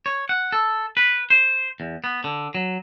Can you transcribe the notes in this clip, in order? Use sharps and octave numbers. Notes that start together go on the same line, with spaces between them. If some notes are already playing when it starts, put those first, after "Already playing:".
C#5
F#5
A4
B4
C5
E2
B3
D3
F#3